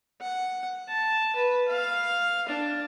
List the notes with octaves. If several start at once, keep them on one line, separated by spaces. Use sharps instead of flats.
F#5
A5
B4
F5
D4